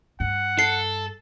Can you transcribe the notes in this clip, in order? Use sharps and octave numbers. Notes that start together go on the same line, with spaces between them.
G2 F#5
A4 C7